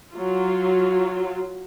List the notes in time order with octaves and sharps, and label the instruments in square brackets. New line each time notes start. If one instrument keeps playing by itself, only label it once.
[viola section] F#3 F4